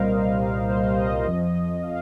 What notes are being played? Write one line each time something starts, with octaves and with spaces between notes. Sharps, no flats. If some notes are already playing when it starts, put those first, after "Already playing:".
Already playing: C2 A#2 G3 A#4 C5 D#5 F5
C5
D#5
F2 F3
F5